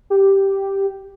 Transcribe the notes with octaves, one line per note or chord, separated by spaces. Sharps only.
G4